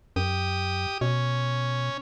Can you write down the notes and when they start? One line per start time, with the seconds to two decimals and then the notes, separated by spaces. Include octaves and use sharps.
0.16 F#2 G4 D#6
1.01 B2 C#4